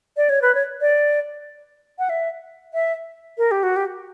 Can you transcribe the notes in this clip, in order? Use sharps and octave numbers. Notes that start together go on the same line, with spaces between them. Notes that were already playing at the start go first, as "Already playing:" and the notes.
D5
C#5
B4
C#5
D5
F#5
E5
E5
A#4
G4
F#4
G4